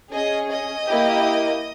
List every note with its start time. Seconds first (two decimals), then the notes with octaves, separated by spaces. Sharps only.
0.12 C#4 G#4 D#5
0.50 D#5
0.88 A#3 E4 G4